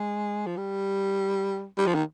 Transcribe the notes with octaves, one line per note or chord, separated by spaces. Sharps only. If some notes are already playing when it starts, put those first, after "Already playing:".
Already playing: G#3
F3
G3
G3
F3
D#3